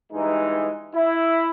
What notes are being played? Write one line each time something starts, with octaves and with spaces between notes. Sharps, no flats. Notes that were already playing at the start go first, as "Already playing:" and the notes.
G2 E3 G#3 D#4
E4